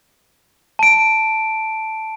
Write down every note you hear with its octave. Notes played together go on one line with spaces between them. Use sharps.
A5 D7